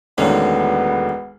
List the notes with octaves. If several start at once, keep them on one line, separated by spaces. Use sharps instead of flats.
E1 D2 D3 D#3 A#3 B3 C#4